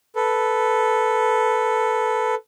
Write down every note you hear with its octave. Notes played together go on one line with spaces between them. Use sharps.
A4 B4